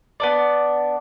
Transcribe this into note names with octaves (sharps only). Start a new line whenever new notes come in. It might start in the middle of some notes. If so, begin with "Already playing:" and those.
B3 D4 D5